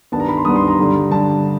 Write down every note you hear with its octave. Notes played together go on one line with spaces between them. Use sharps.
G2 D#3 G3 B3 A5
A#5
B5
C6
G2 D#3 G3 B3 D#6
C6
A#5
G2 D3 G3
G2 D3 G3 A5